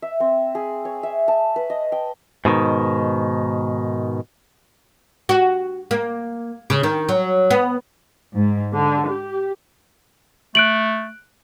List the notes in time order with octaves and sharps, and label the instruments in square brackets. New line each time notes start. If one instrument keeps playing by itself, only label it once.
[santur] E5
C4
G#4
C#5
E5
A5
B4
D#5
G5
[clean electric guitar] G#2 B2 D#3
[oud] F#4
A#3
C#3
D#3
F#3
B3
[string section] G#2
D3
G4
[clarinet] A3 [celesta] F#6 D7 F#7